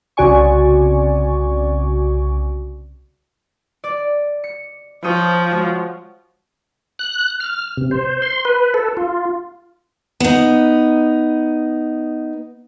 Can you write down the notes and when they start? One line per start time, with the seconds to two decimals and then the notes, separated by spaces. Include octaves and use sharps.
0.17 C2 C#3 F#4 D5 G#5 C#6
3.84 D5
4.44 C#7
5.04 F3 C#5 G5 D#6
5.51 G#3 F#4 C#5
6.99 F#6
7.40 F6
7.77 C3
7.91 C5
8.22 C6
8.45 B4
8.74 A4
8.97 F4
10.20 B3 D#4